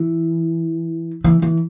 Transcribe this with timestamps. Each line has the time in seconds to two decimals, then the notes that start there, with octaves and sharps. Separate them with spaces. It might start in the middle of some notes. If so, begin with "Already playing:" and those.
Already playing: E3
1.24 E3
1.42 E3